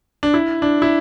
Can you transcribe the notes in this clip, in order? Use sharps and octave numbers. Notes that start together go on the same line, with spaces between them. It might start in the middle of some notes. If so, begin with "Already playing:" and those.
D4
E4
D4
E4